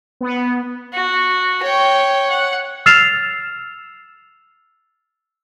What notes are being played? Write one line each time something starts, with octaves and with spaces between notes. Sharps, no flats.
B3
F#4
C#5 G5
F#5
E6 F6 A6 C7 E7 F7